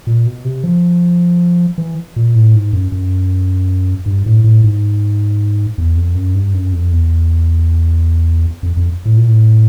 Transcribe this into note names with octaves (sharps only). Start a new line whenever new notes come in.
A#2
B2
C3
F3
E3
A#2
A2
G#2
F#2
F#2
G2
A2
A2
G#2
E2
F2
F#2
G2
F#2
F2
E2
F2
F2
A2
A#2
A2